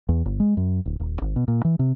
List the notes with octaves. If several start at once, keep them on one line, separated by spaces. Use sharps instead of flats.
E2
G1
G#3
F#2
D1
D#1
G#1
B2
A#2
E3
C3